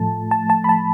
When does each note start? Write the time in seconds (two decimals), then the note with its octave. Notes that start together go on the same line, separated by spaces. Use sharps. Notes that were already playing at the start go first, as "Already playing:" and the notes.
Already playing: A2 F3 A3 A5
0.31 A5
0.50 A5
0.64 B5
0.69 A5